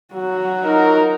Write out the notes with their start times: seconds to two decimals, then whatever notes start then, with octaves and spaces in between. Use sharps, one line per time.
0.13 F#3 F#4
0.64 D#4 F4 A#4